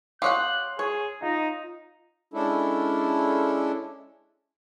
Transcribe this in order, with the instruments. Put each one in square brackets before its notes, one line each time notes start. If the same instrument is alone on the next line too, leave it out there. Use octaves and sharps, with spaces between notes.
[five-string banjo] G4 C#5 F#5 [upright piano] F5 C6 D#6 [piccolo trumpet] F#6
[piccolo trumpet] G#4 [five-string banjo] C#5
[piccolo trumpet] D#4 [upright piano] F4
[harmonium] G#3 C#4 D4 E4 A4